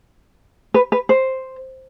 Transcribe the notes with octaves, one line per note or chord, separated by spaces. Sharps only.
B4
B4
C5